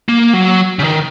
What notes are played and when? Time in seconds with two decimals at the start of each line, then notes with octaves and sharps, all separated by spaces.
0.09 A#3
0.33 F#3
0.79 C#3
0.84 D#3